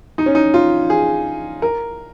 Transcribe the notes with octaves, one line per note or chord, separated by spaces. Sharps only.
D#4
C#4
D#4
F4
G#4
A#4